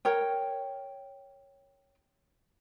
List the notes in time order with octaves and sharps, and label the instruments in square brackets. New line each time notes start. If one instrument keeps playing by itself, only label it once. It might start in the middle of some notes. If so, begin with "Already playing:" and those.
[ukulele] A#4 C#5 G5